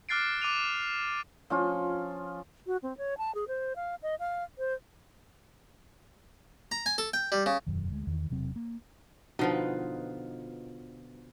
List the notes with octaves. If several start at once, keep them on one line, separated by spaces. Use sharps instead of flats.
D6 F6 F#6 A6 C7 D7
D6 D#7 F7
F3 C#4 F4
F#4
C4
C#5
A5
G#4
C5
F5
D#5
F5
C5
A#5
G#5
A4
G5
G3
C#3
E1 F#2 D#3
D2 G#3
E2 D#3
E1 C3 F#3 C4
A#3
B2 D3 F3 D#4 F4 B4